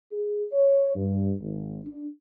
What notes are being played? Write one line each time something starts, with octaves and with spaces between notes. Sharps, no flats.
G#4
C#5
G2
G#1
D4